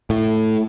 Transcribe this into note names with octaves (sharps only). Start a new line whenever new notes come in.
A2